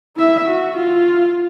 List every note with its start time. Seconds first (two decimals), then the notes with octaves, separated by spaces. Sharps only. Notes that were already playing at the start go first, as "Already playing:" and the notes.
0.17 E4 E5
0.47 F#4
0.77 F4